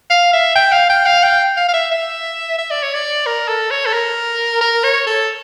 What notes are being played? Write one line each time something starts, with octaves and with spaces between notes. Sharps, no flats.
F5
E5
G5
F5
G5
F5
G5
F5
F5
E5
E5
E5
D5
C#5
D5
A#4
A4
C#5
A4
A#4
A#4
C#5
A4